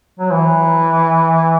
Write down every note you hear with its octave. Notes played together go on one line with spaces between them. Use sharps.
F#3
E3